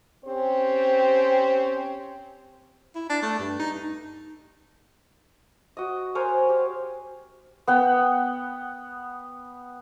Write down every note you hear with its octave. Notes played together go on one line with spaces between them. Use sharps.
C4 C#4 G4 C5
E4
D4
A3
G2
D#4
F#4 D#5
A#4 C5 C#5 G#5
G4
B3 F#5 G5